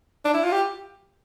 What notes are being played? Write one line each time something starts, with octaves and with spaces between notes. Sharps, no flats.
D4
E4
F4
G4